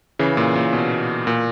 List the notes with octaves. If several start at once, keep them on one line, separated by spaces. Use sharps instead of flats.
C#3 E3
A#2
A#2
B2
A#2